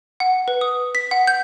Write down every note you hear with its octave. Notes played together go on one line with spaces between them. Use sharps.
F#5
B4
D#6
B6
F#5
G6